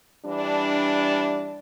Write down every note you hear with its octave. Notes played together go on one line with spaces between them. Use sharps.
E3 G3 D4